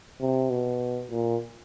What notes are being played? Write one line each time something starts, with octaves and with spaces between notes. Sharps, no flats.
C3
B2
A#2